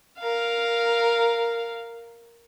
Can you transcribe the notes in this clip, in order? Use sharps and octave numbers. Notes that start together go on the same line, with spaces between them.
A#4 F5